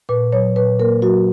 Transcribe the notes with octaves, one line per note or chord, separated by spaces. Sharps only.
A#2 B4
F#3 C#5
A#2 B4
A#3 A#4
F#3 F#4